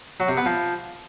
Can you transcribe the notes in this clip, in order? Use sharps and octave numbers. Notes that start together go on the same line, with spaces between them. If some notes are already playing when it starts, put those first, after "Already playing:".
F#3
C3
B3
F3